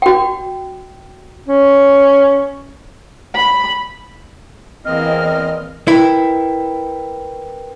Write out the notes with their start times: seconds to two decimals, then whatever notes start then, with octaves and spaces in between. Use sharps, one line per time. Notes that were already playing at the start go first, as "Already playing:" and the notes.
0.02 F#4 G5
1.48 C#4
3.35 B5
4.85 E2 E3 A#3 C4 D#5 F6
5.88 E4 A#4 B4 G5